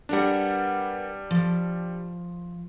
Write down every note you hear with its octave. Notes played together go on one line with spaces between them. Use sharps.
G3 B3 D4 A#4 F#5
F3